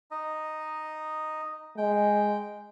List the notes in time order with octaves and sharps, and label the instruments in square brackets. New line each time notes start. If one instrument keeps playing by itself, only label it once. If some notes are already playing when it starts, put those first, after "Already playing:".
[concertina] D#4 D#5
[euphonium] G#3 [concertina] G5